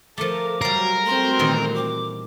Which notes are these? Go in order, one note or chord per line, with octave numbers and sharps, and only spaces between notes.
F3 A3 A4 A#4 D6
F#3 G3 A#4 F5
A3 C4 F#4 C6
A#2 D#3 E3
D6